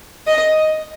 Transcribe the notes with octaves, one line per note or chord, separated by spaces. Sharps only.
D#5